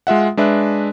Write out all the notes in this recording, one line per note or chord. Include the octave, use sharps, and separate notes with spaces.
G#3 F4 E5 F#5
G#3 D4 B4 E5